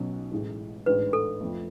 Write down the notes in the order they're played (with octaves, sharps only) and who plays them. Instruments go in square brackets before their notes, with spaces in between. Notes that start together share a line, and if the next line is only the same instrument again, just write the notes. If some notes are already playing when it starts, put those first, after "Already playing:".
Already playing: [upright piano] B1 B2 F#3 C#4
A1 A2 G#3
[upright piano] A1 G#2 G#3 D4 [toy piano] B4
[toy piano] A4
[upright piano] F2 F3 A3